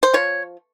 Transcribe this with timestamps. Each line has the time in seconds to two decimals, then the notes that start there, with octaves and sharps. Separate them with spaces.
0.03 C5
0.13 F3 C#5